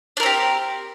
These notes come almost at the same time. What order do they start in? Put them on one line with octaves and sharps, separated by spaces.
D4 A#4 C4 G4